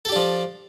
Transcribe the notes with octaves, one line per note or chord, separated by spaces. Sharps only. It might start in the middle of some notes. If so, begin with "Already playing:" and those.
F3 D4 G4 A4